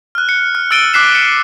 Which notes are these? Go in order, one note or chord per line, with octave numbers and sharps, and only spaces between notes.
F6 F#6
C#7
F6
E6 F#6 A6 D7 D#7 G7
D6 F#6 B6 C7 E7
C#7